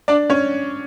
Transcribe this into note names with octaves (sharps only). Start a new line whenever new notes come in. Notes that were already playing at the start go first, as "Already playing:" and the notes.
D4 D5
C#4 C#5